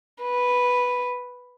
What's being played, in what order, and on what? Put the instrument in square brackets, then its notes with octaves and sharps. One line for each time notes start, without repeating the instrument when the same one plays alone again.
[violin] B4